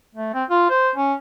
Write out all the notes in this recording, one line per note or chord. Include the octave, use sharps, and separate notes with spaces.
A3
C4
F4
C5
C#4